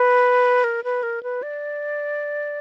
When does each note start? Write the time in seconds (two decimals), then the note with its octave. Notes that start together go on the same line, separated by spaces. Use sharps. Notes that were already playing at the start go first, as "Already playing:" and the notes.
Already playing: B4
0.64 A#4
0.84 B4
1.03 A#4
1.23 B4
1.43 D5